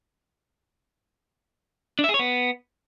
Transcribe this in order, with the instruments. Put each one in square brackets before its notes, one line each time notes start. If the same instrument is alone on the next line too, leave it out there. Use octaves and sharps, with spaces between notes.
[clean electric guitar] D4
E5
G#4
C#5
B3